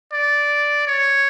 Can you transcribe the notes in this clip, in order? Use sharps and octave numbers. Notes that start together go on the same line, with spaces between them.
D5
C#5